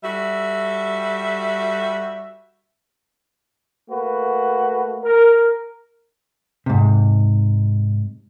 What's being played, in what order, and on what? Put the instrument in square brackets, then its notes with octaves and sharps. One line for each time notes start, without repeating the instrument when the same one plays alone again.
[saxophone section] G3 F#4 A4 E5
[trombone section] A3 A#3 F#4 B4
A#4
[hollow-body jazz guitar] G#2 C3